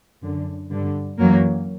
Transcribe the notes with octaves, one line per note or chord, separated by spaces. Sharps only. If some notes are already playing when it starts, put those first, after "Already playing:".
F#2 D3
G2 D3
F#2 E3 F#3 A#3